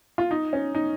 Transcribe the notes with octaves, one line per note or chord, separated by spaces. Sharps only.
F4
D#4
C#4
D#4